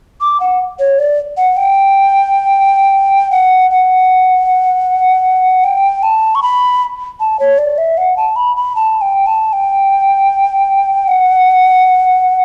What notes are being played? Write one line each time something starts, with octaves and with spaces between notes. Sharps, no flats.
D6
F#5
C#5
D5
F#5
G5
F#5
F#5
G5
A5
C#6
B5
A5
C#5
D5
E5
F#5
A5
B5
B5
A5
G5
A5
G5
F#5